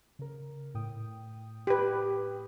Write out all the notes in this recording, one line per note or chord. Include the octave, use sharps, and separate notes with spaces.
C#3 A#4
A2 G5 D#6
G4 B4